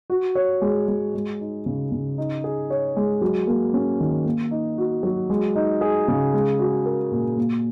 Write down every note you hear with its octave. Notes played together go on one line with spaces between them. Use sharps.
F#4
C#5
G#3
G#3
G#3
D#4
C#3
C#3
D#4
G#4
C#5
G#3
F#3
A#3
C#4
D#3
A#3
D#4
F#4
F#3
G#3
D#4
G#4
C#3
G#3
F#4
A#4
A#2
A#3